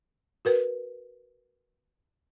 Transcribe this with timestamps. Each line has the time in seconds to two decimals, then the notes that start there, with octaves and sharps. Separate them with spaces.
0.45 F#4 A#4 B4